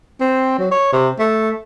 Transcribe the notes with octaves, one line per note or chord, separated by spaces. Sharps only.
C4
F#3
C#5
C3
A3